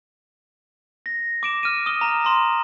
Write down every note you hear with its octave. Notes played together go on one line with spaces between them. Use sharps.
A#6
D6 D7 E7
F6 D#7
D#6 G7
A#5 E7
A#5 C6 E7